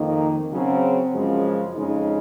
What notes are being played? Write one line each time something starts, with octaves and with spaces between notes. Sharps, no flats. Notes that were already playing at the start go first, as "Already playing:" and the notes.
Already playing: F2 D#3 A#3
C#3 F#3 C4
F#2 C#3 F3 G#3
F2 C#3 G#3 D#4